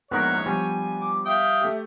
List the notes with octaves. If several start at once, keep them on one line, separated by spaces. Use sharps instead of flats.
A#1 G#2 B3 A#4 C#5 F#6
F3 G3 B3 D4 G#5
D6
E5 F5 G5 D#6
A3 G4